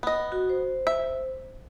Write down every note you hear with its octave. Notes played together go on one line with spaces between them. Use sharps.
B3 D#5
F#4
C5
E5